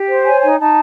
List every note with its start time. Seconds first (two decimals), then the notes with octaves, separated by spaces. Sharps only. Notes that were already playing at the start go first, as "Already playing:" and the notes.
Already playing: G4
0.08 C5
0.24 C#5 G#5
0.42 D#4 G#5
0.59 D#4 A5